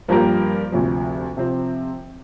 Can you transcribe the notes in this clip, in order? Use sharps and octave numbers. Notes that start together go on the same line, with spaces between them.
G2 F3 A#3 G4 A#4
D2 C3 F3
C3 F3 C4